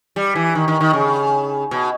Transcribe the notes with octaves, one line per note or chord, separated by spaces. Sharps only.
G3
E3
D#3
D#3
D#3
C#3
B2